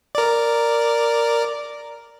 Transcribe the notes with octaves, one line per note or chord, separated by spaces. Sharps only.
A#4 D5